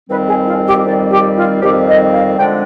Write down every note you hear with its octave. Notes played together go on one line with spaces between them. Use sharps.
F2 D#3 G3 C4 B4
G#4
F4
G4
F2 D#3 G3 C4 D5
G4
F4
F2 D#3 G3 C4 G4
D#5
F5
D3 F3 G#3 D4 G5